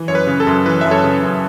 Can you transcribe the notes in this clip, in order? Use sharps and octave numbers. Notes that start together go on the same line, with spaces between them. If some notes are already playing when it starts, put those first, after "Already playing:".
Already playing: E3
F#2 C#5
B4
C#3
A4
F#2
E3 B4
F#2 E5
A4 C#5
C#3
F#2